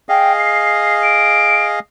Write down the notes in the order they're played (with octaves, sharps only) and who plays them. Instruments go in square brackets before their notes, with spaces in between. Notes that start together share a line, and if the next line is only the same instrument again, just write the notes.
[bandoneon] G#4 D#5 F5 [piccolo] G5
[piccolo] C7
D7